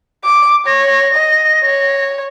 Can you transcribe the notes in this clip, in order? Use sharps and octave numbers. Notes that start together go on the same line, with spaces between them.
D6
C#5 A#6
D#5
C#5